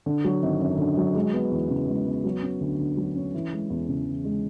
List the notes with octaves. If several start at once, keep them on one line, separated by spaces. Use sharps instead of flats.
D3
F#3
G#1
F#2
D3
F#3
G#3
B3
E2
C#3
G#3
B3
F#3
C#4
D2
D3
F#3
C#4
E3
G#3
E2
C#3
E3
G#3